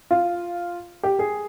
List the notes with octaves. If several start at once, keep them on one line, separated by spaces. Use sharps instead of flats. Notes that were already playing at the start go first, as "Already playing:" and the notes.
F4
G4
G#4